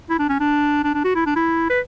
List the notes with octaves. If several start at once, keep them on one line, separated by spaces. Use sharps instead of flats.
E4
D4
C#4
D4
D4
D4
F#4
E4
D4
E4
B4